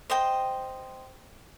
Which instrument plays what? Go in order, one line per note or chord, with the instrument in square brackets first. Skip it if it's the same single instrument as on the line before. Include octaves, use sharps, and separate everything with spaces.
[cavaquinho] C5 D#5 G5